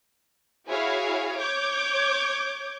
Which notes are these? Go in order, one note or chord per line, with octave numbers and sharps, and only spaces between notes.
E4 F#4 G#4 C#5 F5
C#5 D6 G6 G#6